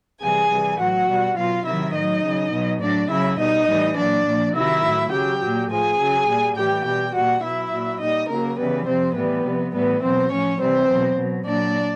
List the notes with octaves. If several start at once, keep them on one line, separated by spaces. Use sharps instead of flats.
C3 E3 G3 G#4 G#5
C3 E3 G3
A2 F#3 F#4 F#5
B2 G3
B2 F#3 F4 F5
C3 D#3 F#3 E4 E5
A2 F#3 D#4 D#5
C#3 F#3
B2 F#3
A2 F#3 D4 D5
C#3 F#3 E4 E5
B2 G3 D#4 D#5
A2 E3 G3
A#2 F#3 D4 D5
A#2 F3
C3 D#3 F#3 E4 E5
A2 F#3
C#3 F#3 G4 G5
A#2 F#3
A2 F3 G#4 G#5
C#3 F#3
A#2 G3
A2 E3 G3 G4 G5
B2 G3 G4 G5
A#2 G3 F#4 F#5
B2 F#3 E4 E5
A#2 F#3
A#2 G3 D#4 D#5
C#3 F#3 A#3 A#4
C#3 E3 G3 B3 B4
C3 F3 C4 C5
A2 E3 G3 B3 B4
C3 F3
A2 E3 G3 B3 B4
B2 F#3 C4 C5
A2 F3 C#4 C#5
C3 E3 G3 C4 C5
B2 F#3
B2 F#3
A#2 F#3 D4 D5